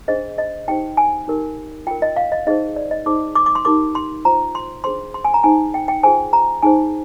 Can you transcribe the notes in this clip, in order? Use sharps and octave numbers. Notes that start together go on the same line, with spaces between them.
D4 G#4 C5 D#5
D#5
D#4 G4 C5 G5
G#5
D#4 G4 A#4
F4 A#4 G5
D#5
F5
D#5
D#4 G#4 C5 D#5
D5
D#5
D#4 G#4 C5 D6
D6
D6
C6
D#4 G4 A#4 D6
C6
F4 C5 A#5
C6
D4 G#4 C5 C6
C6
G#5
A#5
D#4 G#4 C5 G#5
G5
G5
F4 G#4 C5 G#5
A#5
D#4 G#4 C5 G#5